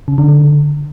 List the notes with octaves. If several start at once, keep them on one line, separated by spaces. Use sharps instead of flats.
C#3
D3
D3